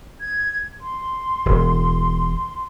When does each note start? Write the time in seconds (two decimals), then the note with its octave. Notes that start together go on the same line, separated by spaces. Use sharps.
0.20 G#6
0.81 C6
1.46 E1